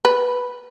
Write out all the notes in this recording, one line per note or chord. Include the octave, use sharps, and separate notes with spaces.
B4